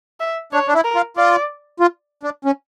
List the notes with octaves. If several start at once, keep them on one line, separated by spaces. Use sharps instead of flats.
E5
D4 C#5
D4
E4
A#4
F4
F4 D5
F4
D4
C#4